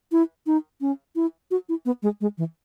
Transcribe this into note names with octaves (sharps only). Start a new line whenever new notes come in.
E4
D#4
C#4
E4
F#4
E4
B3
G#3
G#3
E3